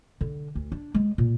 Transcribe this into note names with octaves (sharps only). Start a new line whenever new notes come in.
D3
D2
D4
G#3
A#2